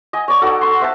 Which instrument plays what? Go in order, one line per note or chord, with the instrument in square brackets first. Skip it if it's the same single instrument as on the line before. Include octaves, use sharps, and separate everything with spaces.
[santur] D#5 G#5
C#5 D5
D#4 F#4 A4
C6
C5 E5 A5